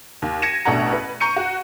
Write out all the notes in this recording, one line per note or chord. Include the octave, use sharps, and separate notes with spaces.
D#2
G#6 A#6 C#7 D#7 E7
A1 B2 A3 D4 F#5 A#5
B4
A#5 C#6 G6 C#7 D#7
F#4